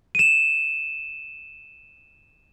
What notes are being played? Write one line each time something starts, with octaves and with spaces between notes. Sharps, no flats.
D#7 E7